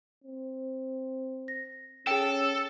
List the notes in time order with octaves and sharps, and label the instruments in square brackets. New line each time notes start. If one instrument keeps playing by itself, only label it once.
[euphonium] C4
[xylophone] A#6
[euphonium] C#4 [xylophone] G#4 G5 [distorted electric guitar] A4